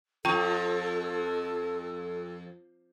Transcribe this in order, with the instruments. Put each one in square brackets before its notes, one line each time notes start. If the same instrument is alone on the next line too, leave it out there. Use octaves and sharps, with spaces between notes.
[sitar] F2 [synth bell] F4 [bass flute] A4 [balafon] G5 C#6